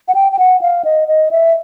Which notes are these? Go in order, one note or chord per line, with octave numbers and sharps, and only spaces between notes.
F#5
G5
G5
F#5
F5
D#5
D#5
E5